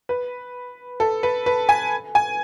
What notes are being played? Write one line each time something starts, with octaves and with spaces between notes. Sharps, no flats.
B4
A4
B4
B4
G#5
G#5